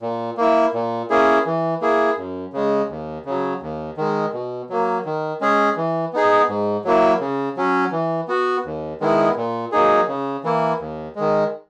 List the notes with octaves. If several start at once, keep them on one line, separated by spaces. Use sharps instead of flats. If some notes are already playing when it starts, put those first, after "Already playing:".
A#2
A#3 E4
A#2
A#3 C#4 E4 G#4
E3
A#3 E4 G#4
F#2
C#3 G#3
D#2
C#3 F#3
D#2
D#3 G#3
B2
F#3 A#3
D#3
G#3 C#4 G#4
E3
B3 D#4 G#4
G#2
F#3 A#3 E4
C#3
F#3 C#4
E3
B3 F#4
D#2
D#3 G#3 B3 E4
A#2
F#3 A#3 D#4 G#4
C#3
E3 A#3 E4
D#2
D#3 G#3